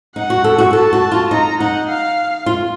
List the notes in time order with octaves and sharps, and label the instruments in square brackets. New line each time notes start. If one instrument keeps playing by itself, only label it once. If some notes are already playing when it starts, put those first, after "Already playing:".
[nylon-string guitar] D#4 [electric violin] F#5
[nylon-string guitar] F#4
A4
F#4
[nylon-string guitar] A4 [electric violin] A5
[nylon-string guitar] F#4
F4
[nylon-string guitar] D#4 [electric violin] A#5
[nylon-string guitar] D#4 [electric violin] F#5
[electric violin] F5
[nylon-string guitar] F4